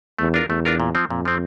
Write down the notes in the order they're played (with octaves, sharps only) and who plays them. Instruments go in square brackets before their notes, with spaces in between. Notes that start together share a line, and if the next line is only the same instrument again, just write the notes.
[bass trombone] E2 [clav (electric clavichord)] A3
[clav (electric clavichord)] D4 F4 A#4
[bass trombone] E2 [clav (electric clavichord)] A3
[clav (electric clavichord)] D4 F4 A#4
A#2
F3 C4
[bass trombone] F2 [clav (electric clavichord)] A#2
[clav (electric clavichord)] F3 C4